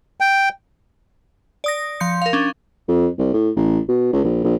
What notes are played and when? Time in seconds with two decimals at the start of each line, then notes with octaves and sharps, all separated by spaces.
0.20 G5
1.64 D5 D#6 A#6
2.00 F3 C6 G6 C#7
2.22 A#4 F5
2.33 C#4 D4
2.88 F2
3.18 C2
3.33 A2
3.56 A1
3.88 B2
4.13 C#2
4.24 A#1
4.44 A#1